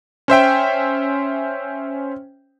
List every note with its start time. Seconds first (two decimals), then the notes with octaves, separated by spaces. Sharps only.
0.28 C#4 C5 E5 G5